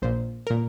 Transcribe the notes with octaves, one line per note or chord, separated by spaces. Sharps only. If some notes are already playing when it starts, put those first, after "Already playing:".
A#1 A#2 C5
A#2 A#4